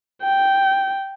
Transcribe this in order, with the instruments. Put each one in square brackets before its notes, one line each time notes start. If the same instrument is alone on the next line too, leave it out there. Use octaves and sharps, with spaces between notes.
[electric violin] G5